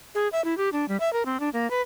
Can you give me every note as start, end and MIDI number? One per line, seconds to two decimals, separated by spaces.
0.15 0.28 68
0.32 0.43 76
0.45 0.57 64
0.58 0.69 67
0.73 0.88 62
0.88 0.97 55
1.00 1.12 76
1.13 1.25 70
1.26 1.40 60
1.40 1.49 62
1.53 1.69 58
1.71 1.81 71